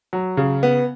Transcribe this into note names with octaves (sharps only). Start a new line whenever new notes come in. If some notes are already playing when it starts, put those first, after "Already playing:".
F#3
C#3
B3